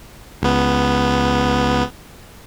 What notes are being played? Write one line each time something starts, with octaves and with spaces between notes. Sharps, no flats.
C#2 B3